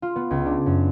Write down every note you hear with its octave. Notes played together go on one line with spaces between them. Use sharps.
F4
B3
C#2
D4
F#2